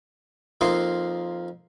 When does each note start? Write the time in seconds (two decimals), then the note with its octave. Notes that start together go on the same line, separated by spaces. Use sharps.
0.61 F2 A#3 D#4 F4 C6